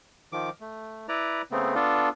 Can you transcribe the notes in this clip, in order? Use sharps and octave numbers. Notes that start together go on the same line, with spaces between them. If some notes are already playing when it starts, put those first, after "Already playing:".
D#3 F3 D6
A3
E4 B4 D5 A#5
C#3 A3 B3 C4
B3 D4 F4 A4